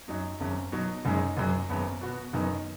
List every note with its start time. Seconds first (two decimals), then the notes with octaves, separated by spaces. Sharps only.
0.08 F#2 F#3 D#4
0.40 G#1 F#2 C#3
0.72 B2 F#3 D#4
1.05 F#1 F#2 C#3 G#3 D#4
1.37 F#1 F#2 F#3
1.69 G#1 F#2 C#3 B3
2.01 B2 B3 F#4
2.33 F#1 F#2 D#3 B3 D#4